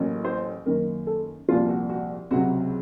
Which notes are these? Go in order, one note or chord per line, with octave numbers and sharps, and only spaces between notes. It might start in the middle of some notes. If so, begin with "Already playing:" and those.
Already playing: A1 A2 F#3 A#3 C#4
C5
F#2 D#3 A#3 A#4
A4
C2 A#2 F3 F4
F#4
F#4
C#2 C3 F#3 F#4